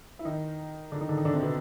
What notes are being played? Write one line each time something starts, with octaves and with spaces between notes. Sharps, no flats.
E4
D#3 D#4
D3 D4
D#3 D#4
D3 D4
D#3 D#4
D3 D4
C3 C4
B2 B3